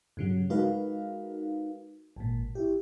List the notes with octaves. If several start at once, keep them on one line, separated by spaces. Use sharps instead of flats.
G2 C#3 F#3
G#3 D#4 F#4 A#4 B4 F5
G#1 A#2
E4 G4